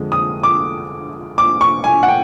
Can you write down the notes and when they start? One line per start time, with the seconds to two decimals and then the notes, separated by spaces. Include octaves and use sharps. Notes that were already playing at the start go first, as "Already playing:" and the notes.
Already playing: F2 D3 G#3
0.12 D#6
0.43 D6
1.38 D6
1.61 C#6
1.84 G#5
2.03 F#5
2.08 G5